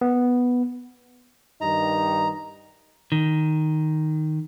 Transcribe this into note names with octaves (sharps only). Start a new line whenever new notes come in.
B3
G2 D#3 D#4 A#5
D#3